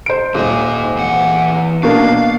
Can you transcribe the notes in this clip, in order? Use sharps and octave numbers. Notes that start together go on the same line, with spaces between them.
C5 D7
D#1 G#2 D#5
E2 F#5
B2 A#3 D4 F5